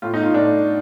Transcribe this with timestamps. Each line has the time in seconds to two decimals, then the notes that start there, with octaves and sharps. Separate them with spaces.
0.02 A2 F4
0.14 D#4
0.23 F4
0.34 A2 D4